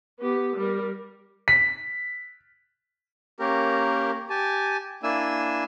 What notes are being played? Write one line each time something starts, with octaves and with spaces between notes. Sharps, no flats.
B3 G4
G3 A#4
B6
A#3 C#4 G4 A#4
G4 G#5 A5
A#3 D4 E4 G#5 E6